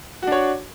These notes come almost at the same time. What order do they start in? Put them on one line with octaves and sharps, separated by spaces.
F#4 D4 C#5